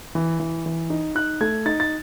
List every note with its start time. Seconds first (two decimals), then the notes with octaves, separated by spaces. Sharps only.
0.15 E3
0.40 E3
0.66 E3
0.90 D#4
1.15 D#4 F#6
1.41 A3 G#6
1.66 D#4 A6
1.80 A6